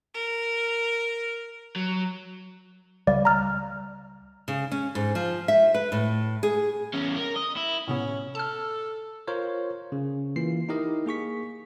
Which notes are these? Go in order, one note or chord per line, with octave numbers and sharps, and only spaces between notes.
A#4
F#3
C#2 G3 D5 F5
A#5 F6
C#3
C#4
G#2
F3
E5
B4
A2
G#4
E2 C#4
A#4
D#5
E4
A2 C3 B3 C#4
A4 A5 F6
F4 A#4 C5 C#5
C#3
E3 A#3 F4 C7
D#4 E4 G4 A#4 D#5
A#3 G#4 C#6 B6